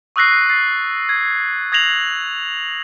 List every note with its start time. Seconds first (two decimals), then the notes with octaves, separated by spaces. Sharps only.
0.16 C#6 D#6 E6 F#6 A#6 C7
0.49 A6 C7
1.09 G#6
1.72 D#6 G#6 A#6 C7 F7 F#7